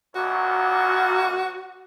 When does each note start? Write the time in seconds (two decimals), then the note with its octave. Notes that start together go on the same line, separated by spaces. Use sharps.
0.15 B1 F#2 A#2 F#4